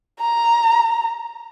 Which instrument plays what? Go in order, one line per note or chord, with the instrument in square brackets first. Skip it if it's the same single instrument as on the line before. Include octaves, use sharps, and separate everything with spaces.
[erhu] A#5